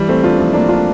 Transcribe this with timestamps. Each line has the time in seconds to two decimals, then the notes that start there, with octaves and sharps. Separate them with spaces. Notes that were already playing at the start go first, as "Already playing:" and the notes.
Already playing: E3 G3
0.08 A3 C4
0.23 D4 F4
0.38 F3 A3
0.53 A#3 D4
0.69 D4 F4